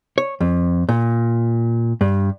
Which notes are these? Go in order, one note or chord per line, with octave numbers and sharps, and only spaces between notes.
C#5
F2
A#2
G2